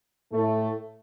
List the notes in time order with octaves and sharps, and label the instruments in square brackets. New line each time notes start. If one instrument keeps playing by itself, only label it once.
[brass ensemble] A2 A3